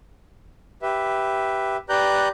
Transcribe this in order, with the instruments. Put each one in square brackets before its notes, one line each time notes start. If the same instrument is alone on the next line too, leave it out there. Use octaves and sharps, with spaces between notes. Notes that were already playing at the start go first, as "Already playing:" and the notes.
[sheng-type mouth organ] G4 B4 E5
G4 B4 D5 A#5 F#6 G6